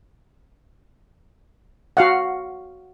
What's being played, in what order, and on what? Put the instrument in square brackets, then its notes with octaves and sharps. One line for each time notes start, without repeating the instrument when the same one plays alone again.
[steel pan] F#4 F5 F#5